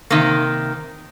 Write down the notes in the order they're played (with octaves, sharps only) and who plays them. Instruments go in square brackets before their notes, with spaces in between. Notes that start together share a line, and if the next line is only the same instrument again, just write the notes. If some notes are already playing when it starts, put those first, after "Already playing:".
[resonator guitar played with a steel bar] C3 D#3 A#3